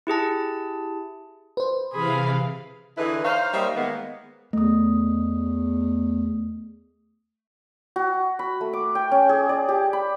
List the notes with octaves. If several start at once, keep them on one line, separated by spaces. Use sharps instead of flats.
E4 G4 G#4 A5
B4 C5
C3 E3 G#4 F5 B5
D3 E3 D#4 E4 G#4 B4
D#4 C5 C#5 F5
G3 A#3 D#4 C5 C#5 E5
D#3 G#3 A#3 B3
E2 A3 D#6
F#4
B5
A3
D6
G5
C#4
G#4
D5
G4
B5